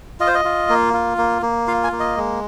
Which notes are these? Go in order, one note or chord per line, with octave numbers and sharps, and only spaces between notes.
F4 D#5
C5
D#5
F4
A#3
F4
A#3
A#3
F4 F5
G#5
A#3
D#5
G#3